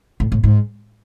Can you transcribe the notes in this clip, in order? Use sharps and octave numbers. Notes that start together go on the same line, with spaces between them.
A2
A2
G#2